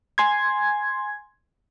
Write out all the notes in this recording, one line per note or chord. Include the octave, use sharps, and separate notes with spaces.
G#5 C6 G#6